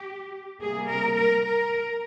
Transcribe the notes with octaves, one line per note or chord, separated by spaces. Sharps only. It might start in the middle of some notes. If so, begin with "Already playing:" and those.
Already playing: G4
C3 G3 A#3 G#4
A#4
A#4
A#4